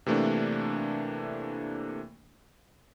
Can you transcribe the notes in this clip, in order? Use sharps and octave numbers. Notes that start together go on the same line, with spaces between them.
C3 E3 A3 A#3 D4